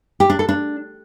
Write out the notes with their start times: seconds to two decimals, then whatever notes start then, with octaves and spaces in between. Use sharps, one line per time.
0.20 G4
0.30 D4
0.39 A4
0.49 D4